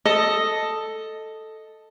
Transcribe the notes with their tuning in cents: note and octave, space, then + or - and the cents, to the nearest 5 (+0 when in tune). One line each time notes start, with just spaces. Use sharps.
A4 +0 D#5 +0 D#6 +0